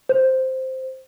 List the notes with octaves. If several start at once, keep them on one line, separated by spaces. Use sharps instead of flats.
C5